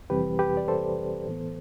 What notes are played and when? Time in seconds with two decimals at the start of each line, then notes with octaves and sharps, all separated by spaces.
0.10 F2 C3 E3 G3 C4 G4 B4
0.39 G4 B4
0.57 D5
0.68 A4 C5
1.26 A2 E3 B3